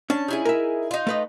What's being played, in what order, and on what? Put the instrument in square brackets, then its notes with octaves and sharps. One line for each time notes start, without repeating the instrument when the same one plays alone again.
[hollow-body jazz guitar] C#4 D4 [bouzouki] A5
[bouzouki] D#4 E4 G#4
[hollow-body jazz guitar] A#4 E5
[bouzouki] D#4 F4
[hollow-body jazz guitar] A3 B4 D#5